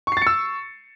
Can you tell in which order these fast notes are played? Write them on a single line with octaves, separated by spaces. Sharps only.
C#6 C7 A6 C#7 E6